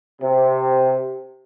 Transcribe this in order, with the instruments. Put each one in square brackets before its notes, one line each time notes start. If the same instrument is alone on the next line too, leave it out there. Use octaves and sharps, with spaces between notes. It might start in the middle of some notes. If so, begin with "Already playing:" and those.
[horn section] C3